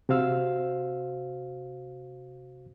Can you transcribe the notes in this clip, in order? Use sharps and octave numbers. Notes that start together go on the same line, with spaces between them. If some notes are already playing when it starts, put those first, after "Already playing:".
C3 F#4 C5 F5 E6